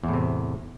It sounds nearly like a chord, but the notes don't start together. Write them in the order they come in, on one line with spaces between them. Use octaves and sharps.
E2 A2 C3